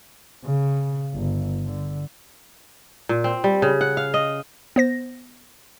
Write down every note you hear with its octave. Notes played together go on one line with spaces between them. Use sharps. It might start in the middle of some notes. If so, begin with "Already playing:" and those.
C#3
G1
D3
A#2
C4
G3
C#3
F#5
F5
D#5
B3 C5 A#6